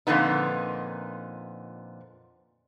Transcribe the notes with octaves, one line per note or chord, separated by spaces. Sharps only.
F2 A#2 D3 B3 D#4